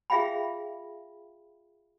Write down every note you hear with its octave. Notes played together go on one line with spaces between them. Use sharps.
F4 G#4 E5 F5 G5 B5